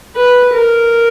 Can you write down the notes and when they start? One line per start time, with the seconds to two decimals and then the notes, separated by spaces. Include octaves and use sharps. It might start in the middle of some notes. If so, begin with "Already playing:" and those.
0.15 B4
0.53 A#4